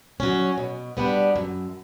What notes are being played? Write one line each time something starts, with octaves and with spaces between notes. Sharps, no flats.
F#3 C#4
B2
G3 B3 D4
F#2